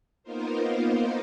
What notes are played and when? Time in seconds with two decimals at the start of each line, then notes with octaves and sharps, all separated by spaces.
0.23 A#3 B3 D#4 F4 A#4 C5